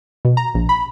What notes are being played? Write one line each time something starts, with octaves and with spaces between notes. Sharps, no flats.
B2
A#5
A#1
B5